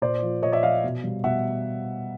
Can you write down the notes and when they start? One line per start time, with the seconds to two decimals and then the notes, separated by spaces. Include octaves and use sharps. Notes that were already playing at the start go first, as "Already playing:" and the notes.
0.02 A#2 C5 D5
0.22 F3
0.43 A#2 C#5 D#5
0.52 D5 E5
0.63 F3 D#5 F5
0.84 B2
1.04 G3
1.24 B2 E5 F#5